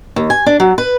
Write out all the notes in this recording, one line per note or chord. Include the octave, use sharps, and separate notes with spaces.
D#2
G#5
D4
F#3
B4